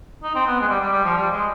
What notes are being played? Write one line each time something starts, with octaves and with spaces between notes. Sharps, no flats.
D#4
C4
B3
G#3
G3
G3
G3
F3
G3
G#3